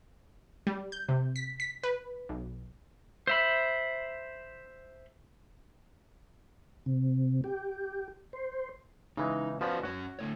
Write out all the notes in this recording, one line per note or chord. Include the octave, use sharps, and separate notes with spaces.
G3
G6
C3
B6
B6
B4
B1
C5 E5 B5
C3
G4
C5
C#3 E3 G#3 D#4
F3 B3 C#4 F#4 B4 D5
F#2 C#4 F#4 C#5
D3 A3 C#5